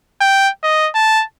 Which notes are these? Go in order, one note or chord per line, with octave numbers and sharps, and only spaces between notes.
G5
D#5
A5